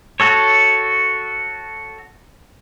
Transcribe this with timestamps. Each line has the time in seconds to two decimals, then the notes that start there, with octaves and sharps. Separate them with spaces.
0.20 F#4 A4 C#5